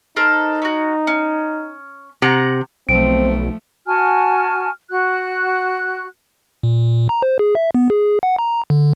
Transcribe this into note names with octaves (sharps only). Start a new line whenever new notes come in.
D#4 A4 A#4 C5
C#4 F#4
C#4
C3 F#5 A#5
B1 F3 A3 C4 D7
F#4 G#5 A5 F6
F#4 F#6
A#2
A#5
C5
G#4
E5
B3
G#4
F#5
A#5
D3